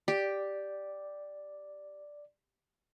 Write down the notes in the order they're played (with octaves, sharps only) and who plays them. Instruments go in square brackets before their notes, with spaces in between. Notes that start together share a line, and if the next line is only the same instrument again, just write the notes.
[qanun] G4 [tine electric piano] D5